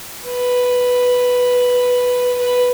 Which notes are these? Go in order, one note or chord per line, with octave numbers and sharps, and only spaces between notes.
B4
B4